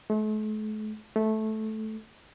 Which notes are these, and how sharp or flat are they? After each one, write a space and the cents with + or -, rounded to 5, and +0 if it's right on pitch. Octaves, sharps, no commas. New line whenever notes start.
A3 -40
A3 -10